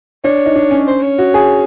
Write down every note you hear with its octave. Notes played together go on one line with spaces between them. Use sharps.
D4 C#5
D#4
D4
C#4
C5
C#5
F#4
G#4